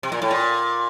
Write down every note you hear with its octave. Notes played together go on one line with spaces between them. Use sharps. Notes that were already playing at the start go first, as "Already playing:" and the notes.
C3
A#2
A2
A#2